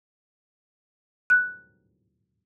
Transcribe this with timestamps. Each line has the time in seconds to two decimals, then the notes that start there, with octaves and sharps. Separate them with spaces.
1.30 F#6